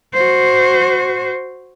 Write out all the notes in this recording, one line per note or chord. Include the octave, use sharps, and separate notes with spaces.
F#4 C5